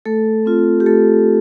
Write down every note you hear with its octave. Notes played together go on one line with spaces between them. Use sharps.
A3 A4
C4 F4
G4
A3 A4